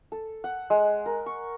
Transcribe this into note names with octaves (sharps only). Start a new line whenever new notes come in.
A4
F#5
G#3
A#4
C#6